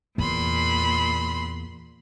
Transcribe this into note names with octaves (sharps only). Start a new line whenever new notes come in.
E2 A#2 B5 C6